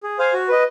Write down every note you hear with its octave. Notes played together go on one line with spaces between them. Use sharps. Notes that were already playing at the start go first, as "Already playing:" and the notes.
G#4
C5 F5 G#5
F#4
B4 D#5